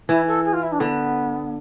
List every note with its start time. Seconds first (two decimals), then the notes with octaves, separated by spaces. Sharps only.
0.09 E3 E4
0.27 A4
0.45 G#4
0.53 F4
0.62 E4
0.72 D4
0.80 D3 B3